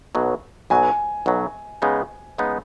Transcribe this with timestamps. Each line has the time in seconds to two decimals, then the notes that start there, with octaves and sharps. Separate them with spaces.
0.15 B1 B2 F#3
0.70 B1 B2 F#3 G#5
1.26 B1 B2 F#3
1.82 C#3 G#3 B3 D#4
2.38 C#3 G#3 B3 D#4